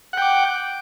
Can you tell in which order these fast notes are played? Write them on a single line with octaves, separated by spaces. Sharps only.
F#5 G5 D6